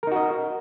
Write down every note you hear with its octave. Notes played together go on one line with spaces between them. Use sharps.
D#4 F#4 A#4 D#5